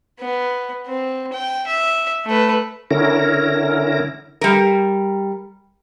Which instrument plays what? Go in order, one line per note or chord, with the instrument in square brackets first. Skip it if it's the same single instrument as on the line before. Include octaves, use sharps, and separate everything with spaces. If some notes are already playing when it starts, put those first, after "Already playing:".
[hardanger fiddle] B3
C4
G5
E5
A3 B4
[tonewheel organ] D3 C#4 E4 A#4 A#6
[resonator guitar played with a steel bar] G3 A#4